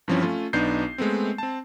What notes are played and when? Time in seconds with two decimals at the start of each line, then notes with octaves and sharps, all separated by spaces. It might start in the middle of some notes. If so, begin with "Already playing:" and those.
0.08 G2 E3 F3 C4 C#4
0.23 A3 C#4 F4
0.53 B1 B3 D4 D#4 G6 C7
0.98 G#3 A3 B3 C4
1.38 C4 A5